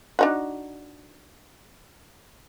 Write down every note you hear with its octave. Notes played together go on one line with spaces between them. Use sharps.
D4 D#4 F#4